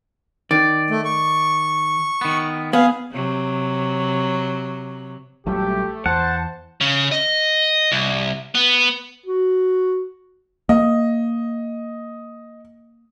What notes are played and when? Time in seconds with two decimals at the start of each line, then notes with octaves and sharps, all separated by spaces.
0.51 D#3 D5
0.90 A3
1.05 C#6
2.21 D#3 B3
2.73 B3 G#4 F5
3.12 C3 F#3
5.46 A#1 F#3 G3 A3 G4
6.06 E2 C5 F#5 A5
6.81 C#3
7.12 D#5
7.92 C2
8.55 B3
9.26 F#4
10.69 A#3 D#5